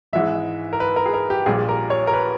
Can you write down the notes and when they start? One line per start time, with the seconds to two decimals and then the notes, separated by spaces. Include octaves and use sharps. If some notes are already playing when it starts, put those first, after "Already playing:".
0.13 G#1 G#2 E3 G#3 E5
0.73 A#4
0.80 B4
0.96 A#4
1.06 G#4
1.14 A#4
1.30 G4
1.46 A#1 A#2 G3 G#4
1.69 A#4
1.90 C#5
2.07 A#4
2.13 B4